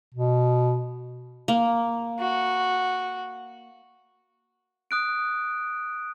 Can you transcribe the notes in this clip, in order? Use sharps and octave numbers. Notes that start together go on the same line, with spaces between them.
B2
A#3
F#4
D#6 F#6 D7